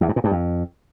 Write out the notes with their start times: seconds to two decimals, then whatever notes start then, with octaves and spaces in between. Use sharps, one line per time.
0.01 E2
0.09 G2
0.16 A#2
0.24 G2
0.31 F2